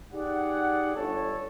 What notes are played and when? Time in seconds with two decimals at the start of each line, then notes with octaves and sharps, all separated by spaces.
0.12 D#4 G4 G#4 D5 F#5
0.96 G1 D3 A4 C#5